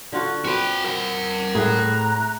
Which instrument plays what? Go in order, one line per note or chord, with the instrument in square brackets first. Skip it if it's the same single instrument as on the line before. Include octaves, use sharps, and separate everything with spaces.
[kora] D3 F4 F#4
[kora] C4 B4 [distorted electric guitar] F#4 G5
[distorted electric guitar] A#4 F#5
[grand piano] A2 [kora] G#4 [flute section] A#5 F#6